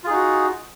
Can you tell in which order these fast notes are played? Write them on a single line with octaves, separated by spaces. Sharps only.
F4 G#4 D#4 F#4